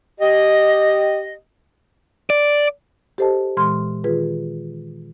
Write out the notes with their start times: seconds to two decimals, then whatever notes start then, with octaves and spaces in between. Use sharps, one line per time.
0.20 G4 D#5
2.30 D5
3.18 G4 A4 C5 D#5 A5
3.57 A#2 E3 G#3 C6 F6
4.04 D#3 F4 G#4 B4